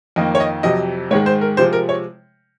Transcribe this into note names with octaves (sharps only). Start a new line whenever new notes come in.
F2 D#3 A#3 D#5
C#5
D#5
F2 C3 F#3 D#5
G#2 D#3 G#3 C#5
C5
A#4
C3 F3 G#3 C5
A#4
C#5